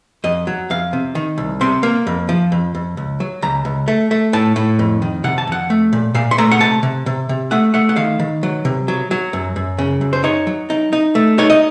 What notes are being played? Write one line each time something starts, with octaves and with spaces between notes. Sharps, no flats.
F2 D#5
F#3
F2 F5
C3
D#3
C2
C3 C6
A#3
F2
F3
F2
F2
C#2
F#3
C#2 A#5
C#2
A3
A3
A2 A5
A2
F2
D#3
C3 F#5
A5
F2 F#5
A3
A#2
A#2 F5
C6
A3 A#5
F#5
C3 A5
C3
C3
C3
A3 F#5
A3 F#5
F#5
D#3 F5
D#3
F#3
C3
F#3
F#3
F#2
F#2
C#3
F#2
C5
D#4 C#5
F#3
D#4
D#4
A3
D#4 C#5
D#5